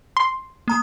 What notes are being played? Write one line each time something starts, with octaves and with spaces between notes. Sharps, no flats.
C6
A#3 A#5 D#6